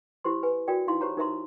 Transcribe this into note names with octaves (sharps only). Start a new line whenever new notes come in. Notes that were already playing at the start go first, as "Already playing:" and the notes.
E4 G4 C5 C6
B4 G#5
F#4 A#4 D5 G5 G#5
D#4 E4 F5 C6
G4 C5 C#5 A#5
D#4 A#4 C5 E5 A#5 C6